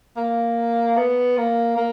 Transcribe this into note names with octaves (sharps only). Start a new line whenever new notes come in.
A#3
B3
A#3
A#3